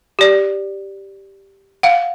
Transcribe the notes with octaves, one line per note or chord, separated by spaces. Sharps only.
G4 D5
F5 F#5